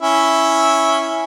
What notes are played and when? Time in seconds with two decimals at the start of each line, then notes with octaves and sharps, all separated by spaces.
0.02 C#4 E4